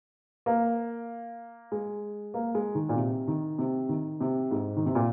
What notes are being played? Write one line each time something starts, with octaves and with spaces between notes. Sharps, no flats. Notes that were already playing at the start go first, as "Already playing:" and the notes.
A#3
G#3
A#3
G#3
D#3
A#2
C3
D#3
C3
D#3
C3
G#2
D#3
C3
A#2